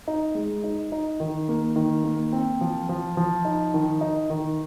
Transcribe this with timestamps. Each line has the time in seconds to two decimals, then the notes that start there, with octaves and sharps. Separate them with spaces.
0.08 D#4
0.35 G#3
0.64 D#4
0.92 D#4
1.20 D#3
1.48 A#3
1.76 D#3
2.04 A#3
2.32 C4
2.61 F3
2.89 F3
3.17 F3
3.45 D#4
3.74 D#3
4.01 D#4
4.30 D#3